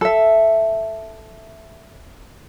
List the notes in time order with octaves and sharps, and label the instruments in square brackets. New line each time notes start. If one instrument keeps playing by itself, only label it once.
[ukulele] A4 E5